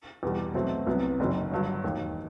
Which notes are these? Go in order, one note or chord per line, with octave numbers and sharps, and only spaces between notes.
E2 B2 G3
B1 B2 F#3 A3 C4
C2 C3 F#3 B3
F#1 F#2 D#3 F#3
G1 G2 F#3
E1 D#2 D#3